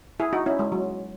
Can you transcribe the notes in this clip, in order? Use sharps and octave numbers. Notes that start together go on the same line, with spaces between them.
E4 G#4
D#4 F#4
C#4 E4
G#3
F#3